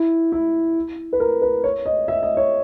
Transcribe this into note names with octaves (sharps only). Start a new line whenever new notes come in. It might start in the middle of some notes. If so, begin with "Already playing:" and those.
Already playing: E4
E4
B4
A#4
B4
C#5
D#5
E5
D#5
C#5